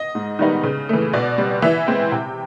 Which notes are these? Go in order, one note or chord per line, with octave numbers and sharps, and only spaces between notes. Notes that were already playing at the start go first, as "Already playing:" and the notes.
Already playing: D#5
G#2
D#3 G3 B3 D#4
C#3
E3 A3
B2 D5
G3 C4
E3 E5
G#3 C4
C3 G5